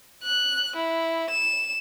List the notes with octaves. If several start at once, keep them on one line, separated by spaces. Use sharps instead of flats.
F#6
E4
E7